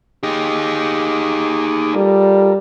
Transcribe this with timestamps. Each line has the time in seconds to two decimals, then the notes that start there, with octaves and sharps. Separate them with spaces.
0.23 D#4 G4 G#4 D6 D#6
1.95 G3 F4 A4 A#4